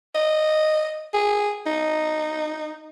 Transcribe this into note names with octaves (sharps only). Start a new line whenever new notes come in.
D#5
G#4
D#4